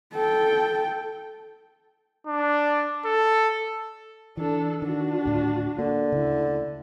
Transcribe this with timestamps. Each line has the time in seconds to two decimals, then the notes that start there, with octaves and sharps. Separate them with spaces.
0.13 A4 G5
2.26 D4
3.05 A4
4.37 E3 D4 A4
4.82 D#3 D4 F#4
5.25 D2 A2
5.78 D3 A#3
6.12 D2 C#3 E4